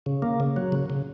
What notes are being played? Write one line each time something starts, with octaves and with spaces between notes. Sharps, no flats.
C#3
A#3
C#3
F#3
C#3
C#3